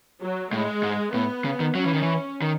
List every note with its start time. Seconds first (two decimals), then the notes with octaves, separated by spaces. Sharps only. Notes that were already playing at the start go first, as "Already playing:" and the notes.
0.22 F#3
0.53 A2 G#3
0.83 G#2
1.14 A2 B3
1.45 C#3
1.60 D#3
1.75 F#3 C#4
1.84 E3
1.94 D#3
2.02 E3
2.42 D#3